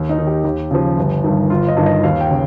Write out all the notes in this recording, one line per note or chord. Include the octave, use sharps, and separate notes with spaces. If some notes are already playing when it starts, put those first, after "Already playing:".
Already playing: D#2
D#4
D#3
G4
D#2 G4
C#3 F3
G1
G2 D#3
G1 F4
D#5
G2 D#3
D#5
D#2 F5
G5
C#3